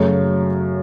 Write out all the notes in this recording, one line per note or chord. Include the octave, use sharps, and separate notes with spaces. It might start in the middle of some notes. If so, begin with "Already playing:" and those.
Already playing: F#2 C#3 F#3 A3